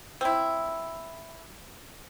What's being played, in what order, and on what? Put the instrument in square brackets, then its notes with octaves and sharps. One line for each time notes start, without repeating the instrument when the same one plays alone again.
[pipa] C4 E4